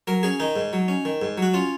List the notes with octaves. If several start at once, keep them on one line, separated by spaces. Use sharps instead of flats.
F#3 A#4
C#4 G#4
D#3 D#4
G#2
F#3
C#4
D#3
G#2
F#3 F#4
C#4 F4